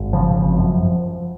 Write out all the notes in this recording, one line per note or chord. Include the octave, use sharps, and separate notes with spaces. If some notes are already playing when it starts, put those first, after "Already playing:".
Already playing: G#1
C#3 F3
G#1
F#2